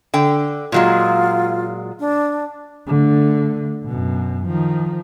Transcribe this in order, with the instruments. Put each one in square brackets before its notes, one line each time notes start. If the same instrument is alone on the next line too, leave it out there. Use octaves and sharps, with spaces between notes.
[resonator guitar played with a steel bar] D3 G5
[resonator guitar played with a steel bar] A#2 F#3 G#3 [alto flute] F4
[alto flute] D4
[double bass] D3 A3
F#2 B2
D#3 F3